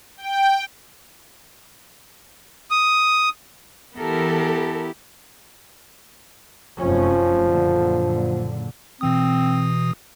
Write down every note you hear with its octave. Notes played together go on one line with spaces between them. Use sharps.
G5
D#6
E3 B3 E4 G4 A4 A#4
F1 F#2 F3 C#4
F#1 A#2 D3
B2 E3 C4 D#6